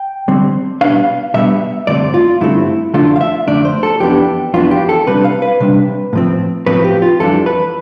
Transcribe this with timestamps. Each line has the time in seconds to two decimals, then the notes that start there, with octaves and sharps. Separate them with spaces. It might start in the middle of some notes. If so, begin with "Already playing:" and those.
Already playing: G5
0.28 D3 G3 C4
0.81 B2 G3 B3 D4 F5
1.34 B2 G3 B3 D4 E5
1.87 G2 D3 A3 C4 D5
2.14 F4
2.41 G2 D3 A3 C4 E4
2.94 F2 D3 A3 D4 F4
3.16 F5
3.21 E5
3.47 F2 D3 A3 D4 D5
3.65 C5
3.83 A4
4.00 F2 E3 B3 D4 G4
4.54 F2 E3 B3 D4 F4
4.71 G4
4.89 A4
5.07 C3 G3 D4 B4
5.24 F5
5.42 B4
5.60 C3 G3 D4
6.13 A2 F3 C4
6.66 A2 F3 C4 B4
6.84 G4
7.02 F4
7.20 F2 E3 G3 D4 A4
7.46 B4